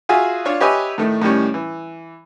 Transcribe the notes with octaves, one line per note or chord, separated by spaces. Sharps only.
F4 F#4 G#4 E5 G#5
D4 F4 C#5 C#6
G4 B4 C#5 D#5 E5 G#5
A2 D#3 A3
A2 D#3 G3 C#4
E3